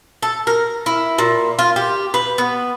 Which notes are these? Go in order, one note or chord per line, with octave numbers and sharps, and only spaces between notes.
A4
A#4
E4
A#2
F4
G4
B4
B3